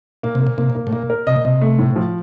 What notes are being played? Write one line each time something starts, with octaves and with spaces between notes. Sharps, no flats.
A#2 A#3
C3
A#3
A#2
C3 A#3
A#2
A#3
A2
A#2 A#3
A#4
C3 D#5
A#2
C3 D#5
A3
A2
F3